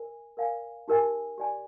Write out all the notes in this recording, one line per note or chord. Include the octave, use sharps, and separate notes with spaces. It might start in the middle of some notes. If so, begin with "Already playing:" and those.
Already playing: A#4 D#5 G#5
A#4 D5 F5 G#5
D#4 G4 A#4 D#5 G#5
G4 D5 G#5